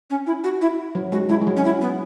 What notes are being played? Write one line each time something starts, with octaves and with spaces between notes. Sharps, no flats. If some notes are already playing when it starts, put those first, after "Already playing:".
C#4
E4
F#4
E4
F#3
G#3 F#4
G#3 E4
G#3
F#3
C#4
E4
B3